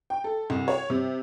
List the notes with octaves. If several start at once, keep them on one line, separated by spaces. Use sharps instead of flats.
G5
A4
C2
C#5
C3